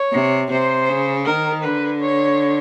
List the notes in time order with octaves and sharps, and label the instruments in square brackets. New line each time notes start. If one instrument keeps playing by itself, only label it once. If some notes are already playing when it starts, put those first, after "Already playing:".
Already playing: [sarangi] C#5
[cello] C3
[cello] C3 [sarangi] C5
[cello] C#3
[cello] D#3 [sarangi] A#4
[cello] D3 [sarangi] B4
[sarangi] C#5